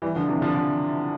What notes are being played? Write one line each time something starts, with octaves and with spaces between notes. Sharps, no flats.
E3 G3
D3 F3
C3 E3
D3 F3
D3 F3